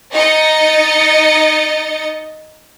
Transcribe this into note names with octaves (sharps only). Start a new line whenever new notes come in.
D#4 D#5 A6 C#7